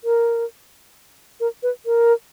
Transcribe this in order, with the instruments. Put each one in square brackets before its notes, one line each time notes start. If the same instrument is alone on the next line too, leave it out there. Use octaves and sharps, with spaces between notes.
[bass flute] A#4
A#4
B4
A#4